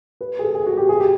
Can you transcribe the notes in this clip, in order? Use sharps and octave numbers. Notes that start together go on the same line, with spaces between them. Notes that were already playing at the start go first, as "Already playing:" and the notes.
B4
G#4
A4
G#4
F#4
G4
G#4
G4